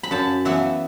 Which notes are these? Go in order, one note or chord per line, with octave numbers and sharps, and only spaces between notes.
B5
F#2 A5
E3 B3 E4 E5